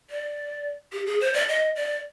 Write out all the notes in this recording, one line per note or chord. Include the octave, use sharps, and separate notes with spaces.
D5
G4
G#4
C5
D5
D#5
D5